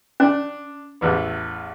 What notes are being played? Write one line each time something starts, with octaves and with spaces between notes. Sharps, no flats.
C#4 D4
A1 E2 B3